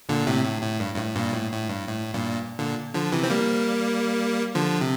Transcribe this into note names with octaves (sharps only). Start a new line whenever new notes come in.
A#2 D3
A2 C3
A2
A2
G2
G2
A2
G2 A#2
A2
A2
G2
A2
G2 A#2
A#2 D3
D3 F3
C3 E3
C4
G3 A#3
D3 F3
C3